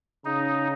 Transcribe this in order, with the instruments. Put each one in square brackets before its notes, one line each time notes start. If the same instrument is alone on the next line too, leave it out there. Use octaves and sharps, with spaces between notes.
[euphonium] C#3 [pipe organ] D#4